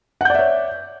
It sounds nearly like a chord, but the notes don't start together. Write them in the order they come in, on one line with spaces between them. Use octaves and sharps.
F#5 G6 D5 E5 C#5